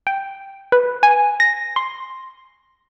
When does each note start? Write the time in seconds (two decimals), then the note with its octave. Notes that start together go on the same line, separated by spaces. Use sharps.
0.07 G5
0.72 B4
1.03 G#5
1.40 A#6
1.76 C6